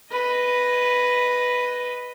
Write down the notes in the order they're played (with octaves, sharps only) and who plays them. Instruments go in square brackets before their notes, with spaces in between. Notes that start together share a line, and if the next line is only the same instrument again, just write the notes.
[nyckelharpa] B4 D#5